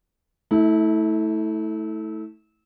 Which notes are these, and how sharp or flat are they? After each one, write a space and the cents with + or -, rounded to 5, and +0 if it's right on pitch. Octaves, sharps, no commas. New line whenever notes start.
A3 +0 E4 -30